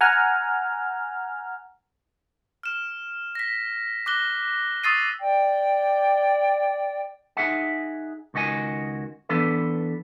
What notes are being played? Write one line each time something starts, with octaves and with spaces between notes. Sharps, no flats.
F#5 G#5 A#5 F6
F6 E7
A#6 B6
D6 F#6 A#6 G7
C#6 D#6 E6 A6 C7 D#7
D5 G5
D#4 G#4 E5 F#5
C#2 D#3 F#4 D#5 G#5
E3 B3 D4 A4 B4